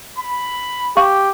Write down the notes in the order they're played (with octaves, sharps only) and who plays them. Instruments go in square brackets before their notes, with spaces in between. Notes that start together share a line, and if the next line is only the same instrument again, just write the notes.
[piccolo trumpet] B5
[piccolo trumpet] G4 [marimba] F5 C#6